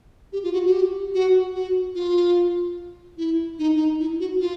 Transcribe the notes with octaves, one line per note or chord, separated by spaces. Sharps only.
G4
F4
F#4
F#4
G4
F#4
F#4
F4
E4
D#4
D#4
E4
F#4
F4